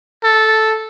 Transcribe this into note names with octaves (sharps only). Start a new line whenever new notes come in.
A4